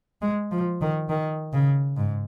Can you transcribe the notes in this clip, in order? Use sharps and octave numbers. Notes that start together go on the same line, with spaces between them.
G#3
F3
D#3
D#3
C#3
G#2